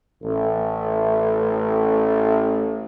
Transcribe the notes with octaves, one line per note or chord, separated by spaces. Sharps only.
A1 A3